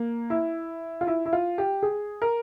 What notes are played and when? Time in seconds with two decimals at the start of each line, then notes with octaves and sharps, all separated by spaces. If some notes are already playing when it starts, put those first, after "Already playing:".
Already playing: A#3
0.30 E4
1.01 F4
1.07 E4
1.26 E4
1.33 F4
1.58 G4
1.83 G#4
2.22 A#4